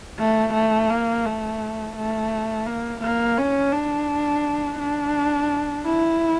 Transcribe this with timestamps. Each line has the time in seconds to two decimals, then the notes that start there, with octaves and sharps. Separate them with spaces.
0.19 A3
0.54 A3
0.90 A#3
1.25 A3
1.96 A3
2.66 A#3
3.01 A#3
3.37 C#4
3.73 D4
4.79 D4
5.85 E4